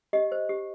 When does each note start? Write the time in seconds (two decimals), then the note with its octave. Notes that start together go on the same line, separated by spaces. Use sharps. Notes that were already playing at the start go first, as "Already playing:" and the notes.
0.13 G4 D#5
0.32 C5
0.49 G4